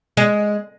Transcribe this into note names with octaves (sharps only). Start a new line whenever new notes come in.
G#3